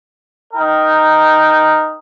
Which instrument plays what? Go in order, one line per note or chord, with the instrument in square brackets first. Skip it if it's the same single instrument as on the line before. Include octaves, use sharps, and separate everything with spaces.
[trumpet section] D#4 A#4 G5